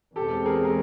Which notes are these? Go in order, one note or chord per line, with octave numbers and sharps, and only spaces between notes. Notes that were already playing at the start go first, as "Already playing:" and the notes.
E2 B2 G#3 C4 G4 A4
G#4 A#4
A#4